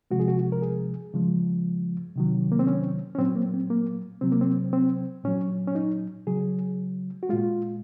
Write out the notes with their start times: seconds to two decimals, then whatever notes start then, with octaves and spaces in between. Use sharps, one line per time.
0.11 C3 F3 G#3 F#4
0.20 G#4
0.28 F#4
0.52 A#4
0.62 G#4
1.14 C#3 F3 G#3
2.16 C3 D#3 F#3
2.52 A#3
2.59 C4
2.67 C#4
3.15 C#4
3.18 A#2 F#3 C4
3.36 A#3
3.54 C4
3.70 A#3
4.21 C3 F#3 C4
4.32 A#3
4.41 C4
4.73 C4
5.24 A#2 F#3 C#4
5.67 C#4
5.75 D#4
6.27 C#3 F#3 G#4
7.23 F#4
7.29 A#2 G#3 F4